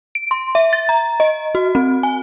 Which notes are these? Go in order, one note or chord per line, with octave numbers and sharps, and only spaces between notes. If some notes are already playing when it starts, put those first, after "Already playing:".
D7
C6
E5
A6
A#5
D#5
F#4
C4
G#5